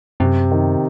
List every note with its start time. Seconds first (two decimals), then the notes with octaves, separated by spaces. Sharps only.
0.20 F#2 C3
0.52 D#3